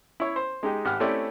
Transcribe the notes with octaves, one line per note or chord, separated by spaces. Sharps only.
E4 C#5
C5
G#3 D#4 G4
G#1 G4 F#5 F6
A3 C4 C#4 E4 G4 D5